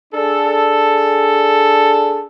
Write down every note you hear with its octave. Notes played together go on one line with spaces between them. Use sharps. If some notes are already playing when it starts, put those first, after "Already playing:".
D4 G#4 A4